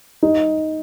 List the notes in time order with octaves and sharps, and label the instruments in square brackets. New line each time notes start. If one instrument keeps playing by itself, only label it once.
[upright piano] D#4